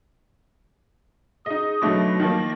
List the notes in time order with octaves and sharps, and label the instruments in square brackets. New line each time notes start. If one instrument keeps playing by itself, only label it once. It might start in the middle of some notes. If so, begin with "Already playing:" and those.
[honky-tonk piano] D#4 D#5 [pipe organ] G#4
[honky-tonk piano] B2 D3 A3 [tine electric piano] F#3 D#4 D6 [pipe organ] D#5 A#6
[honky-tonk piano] D#3 F3 A#3